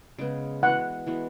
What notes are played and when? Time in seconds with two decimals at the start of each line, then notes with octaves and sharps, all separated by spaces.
0.18 C#3 G#3 B3
0.63 E3 G#3 B3 F#4 F#5
1.07 E3 G#3 B3 F#4